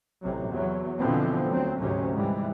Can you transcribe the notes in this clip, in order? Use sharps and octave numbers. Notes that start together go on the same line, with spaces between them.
A1 C3 F#3
E2 F#3
B2 D3 E3 F3 B3 C4
D2 F#3 C4
D2 G#2 C3 F#3 C#4
G#2 C3 E3 G3